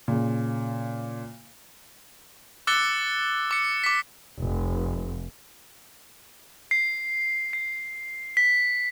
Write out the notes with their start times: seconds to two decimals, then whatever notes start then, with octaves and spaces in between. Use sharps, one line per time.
0.08 A#2 C#3
2.67 D6 E6 F#6 A6 C#7 G7
3.51 D6 C#7
3.84 D6 B6
4.40 F1
6.71 C7
7.53 C7
8.37 B6